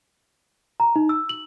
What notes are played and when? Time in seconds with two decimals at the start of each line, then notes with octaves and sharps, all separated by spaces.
0.80 A#5
0.96 D#4
1.09 E6
1.29 F#7